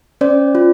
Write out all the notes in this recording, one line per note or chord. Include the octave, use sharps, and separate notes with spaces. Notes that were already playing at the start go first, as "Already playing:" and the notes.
C#4 C5 D5
F4